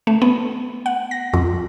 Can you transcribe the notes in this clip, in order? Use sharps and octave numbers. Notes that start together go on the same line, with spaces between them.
A3
B3
F#5
A#6
F2